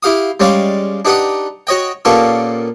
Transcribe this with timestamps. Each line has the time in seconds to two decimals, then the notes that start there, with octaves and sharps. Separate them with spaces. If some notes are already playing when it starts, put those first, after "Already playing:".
0.03 E4 G4 F5 D#6
0.40 G3 G#3 C#4 D5 F5
1.05 D4 D#4 G4 B4 F#5 D#6
1.67 F#4 C#5 D#5 G5
2.05 A#2 A#3 B3 C#4 G4 A4